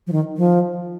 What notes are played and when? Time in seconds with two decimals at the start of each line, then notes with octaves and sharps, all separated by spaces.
0.07 F3
0.12 D#3
0.37 F3